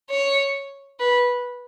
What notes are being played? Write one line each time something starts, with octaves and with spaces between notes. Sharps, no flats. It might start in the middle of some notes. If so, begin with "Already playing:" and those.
C#5
B4